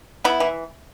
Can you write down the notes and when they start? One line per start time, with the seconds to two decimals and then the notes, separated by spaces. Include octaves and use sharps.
0.24 B3 E4
0.40 E3